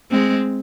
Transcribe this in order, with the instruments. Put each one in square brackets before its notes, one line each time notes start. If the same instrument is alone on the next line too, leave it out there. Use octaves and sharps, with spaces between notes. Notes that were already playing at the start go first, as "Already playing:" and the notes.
[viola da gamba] G#3 C4